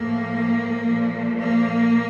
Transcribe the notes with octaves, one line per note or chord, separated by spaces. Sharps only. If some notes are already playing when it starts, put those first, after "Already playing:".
Already playing: A2 F3 A3 A#3
A#2 F3 A3
A#3